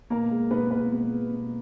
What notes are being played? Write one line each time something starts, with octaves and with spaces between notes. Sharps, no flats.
B2 A#3 A#4
G#3
B2 B3 B4
G#3 B3 B4
B2
G#3
B2